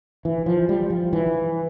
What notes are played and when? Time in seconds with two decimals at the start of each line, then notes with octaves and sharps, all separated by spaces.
0.25 E3
0.46 F3
0.69 G3
0.90 F3
1.13 E3